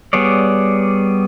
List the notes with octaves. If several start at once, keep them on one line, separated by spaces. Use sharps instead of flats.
G3 B3 G#4 C#5 D5